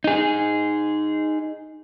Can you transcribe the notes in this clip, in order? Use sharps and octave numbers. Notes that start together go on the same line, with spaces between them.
D#4 G#4